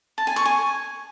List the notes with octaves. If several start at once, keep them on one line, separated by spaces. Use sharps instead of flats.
A5
G#5
C#6
G#5